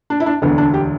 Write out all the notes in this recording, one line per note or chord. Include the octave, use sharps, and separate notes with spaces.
D4
E4
D4
E1 D2 D3 B3
D4
G4